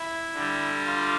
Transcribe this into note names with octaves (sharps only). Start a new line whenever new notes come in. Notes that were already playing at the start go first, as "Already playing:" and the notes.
Already playing: E4
D3 G3
F4